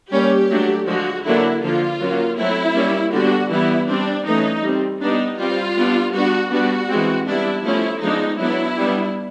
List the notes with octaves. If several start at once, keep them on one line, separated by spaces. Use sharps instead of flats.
G3 A#3 C#4 G4
F#3 A3 D4
D3 F3 G#3 F#4
D3 F#3 A#3 D4 E4
D3 F3 A#3 F4
F#3 A#3 C#4
F#3 A3 C4 E4
G3 A#3 C#4
D3 G3 B3 D4 F#4
E3 G3 B3 E4
G3 C4 D4
E3 A3 C#4 D#4
G3 C4
G3 B3 D4 D#4
G3 C4 F4
G3 B3 D4
G3 B3 D4 F#4
G3 B3 D4 F#4
E3 G#3 C4
G3 B3 D4 E4
F3 A3 C#4 E4
F3 G#3 B3 D4 D#4
F#3 B3 D4 E4
G3 B3 D4